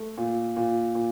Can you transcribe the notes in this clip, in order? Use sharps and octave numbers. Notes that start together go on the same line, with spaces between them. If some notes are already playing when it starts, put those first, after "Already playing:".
Already playing: A3
A#2
A#2
A#2